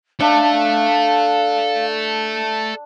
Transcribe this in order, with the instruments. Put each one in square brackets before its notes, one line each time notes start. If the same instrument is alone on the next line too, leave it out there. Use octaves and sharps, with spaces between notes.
[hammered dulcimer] D4 [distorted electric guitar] A4 E5 [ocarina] F5